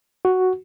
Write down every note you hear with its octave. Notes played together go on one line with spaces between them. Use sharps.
F#4